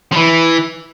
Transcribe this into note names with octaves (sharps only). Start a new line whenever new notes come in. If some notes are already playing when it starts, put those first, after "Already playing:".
F3
E3